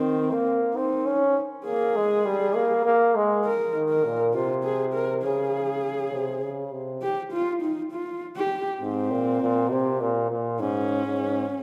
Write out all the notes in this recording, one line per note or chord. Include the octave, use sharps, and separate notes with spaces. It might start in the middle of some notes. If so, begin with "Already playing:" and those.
Already playing: D#3 C4
A#3
C4 D#4
C#4
A#3 G#4
G#3
G3
A#3
A#3
G#3
A#4
D#3
A#4
A#2
C3 F4
G#4
A#4
C#3 G#4
C3
C#3
C3
G4
F4
D#4
F4
G4
G#2 C4
A#2
A#2
C3
A#2
A#2
G#2 C#4
G#2